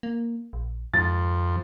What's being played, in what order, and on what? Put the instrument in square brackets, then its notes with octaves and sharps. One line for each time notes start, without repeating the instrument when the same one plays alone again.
[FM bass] A#3
A#1
[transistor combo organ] F2 [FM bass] G#2 [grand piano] A6